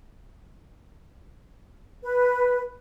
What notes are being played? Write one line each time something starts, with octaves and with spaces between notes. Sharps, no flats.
B4